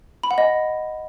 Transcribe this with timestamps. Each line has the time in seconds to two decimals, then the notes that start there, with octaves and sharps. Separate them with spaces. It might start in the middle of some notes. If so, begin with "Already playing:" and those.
0.23 B5
0.31 F#5
0.38 D#5